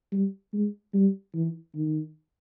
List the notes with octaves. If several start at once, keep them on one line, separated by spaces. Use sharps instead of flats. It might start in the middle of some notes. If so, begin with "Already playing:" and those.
G3
G#3
G3
E3
D#3